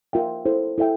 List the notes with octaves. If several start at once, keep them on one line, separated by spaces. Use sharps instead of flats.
F4 A#4 E5 G5
E4 A4 C5
E4 A4 E5 G5